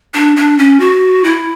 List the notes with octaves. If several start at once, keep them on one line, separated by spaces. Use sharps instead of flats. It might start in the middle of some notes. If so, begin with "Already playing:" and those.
D4
D4
C#4
F#4
E4